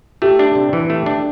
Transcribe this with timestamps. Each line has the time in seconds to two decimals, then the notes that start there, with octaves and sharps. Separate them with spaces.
0.22 A3 G4
0.39 D4
0.55 C3
0.73 E3
0.90 A3
1.06 D4